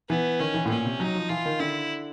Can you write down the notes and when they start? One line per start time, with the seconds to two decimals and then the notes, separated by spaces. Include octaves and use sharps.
0.09 E3 B3
0.40 D#3 C#4
0.54 E3
0.65 A2
0.69 A#2 C#4
0.85 C3
1.00 F#3 D#4
1.15 F3
1.30 E3 F4
1.45 D#3
1.60 D3 E4